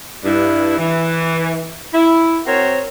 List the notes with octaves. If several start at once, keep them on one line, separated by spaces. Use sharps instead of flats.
G2 E4
E3
E4
C4 F#4 A#4 C5 C#5